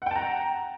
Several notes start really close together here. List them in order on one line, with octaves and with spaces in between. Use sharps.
F#5 G5 A5 A#5